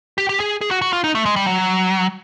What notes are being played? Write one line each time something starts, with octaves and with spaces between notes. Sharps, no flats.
G4
G4
G#4
G#4
F#4
F#4
F4
D#4
A3
G#3
G3
F#3